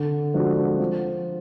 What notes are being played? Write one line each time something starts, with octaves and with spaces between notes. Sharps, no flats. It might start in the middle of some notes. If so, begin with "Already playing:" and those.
Already playing: D3
F3 G#3 D4 F#4
F3